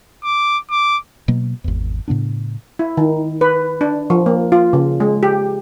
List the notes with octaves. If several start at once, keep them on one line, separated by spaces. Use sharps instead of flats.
D6
D6
B2 F#3 A#3
G#1 E2
A2 C#3 B3 D4
E4
D#3
B4
D4
F3
A#3
F4
C#3
G#3
G4